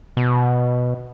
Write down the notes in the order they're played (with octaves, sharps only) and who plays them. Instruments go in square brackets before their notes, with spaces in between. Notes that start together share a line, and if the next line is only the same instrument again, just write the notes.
[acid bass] B2